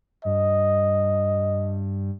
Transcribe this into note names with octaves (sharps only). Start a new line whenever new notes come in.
G2 D#5